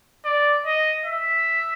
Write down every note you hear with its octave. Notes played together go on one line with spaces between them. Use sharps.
D5
D#5
E5